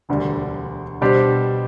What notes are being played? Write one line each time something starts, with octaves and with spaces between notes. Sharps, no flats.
E1 D2 D3 G3
B2 G3 D4 G4 C5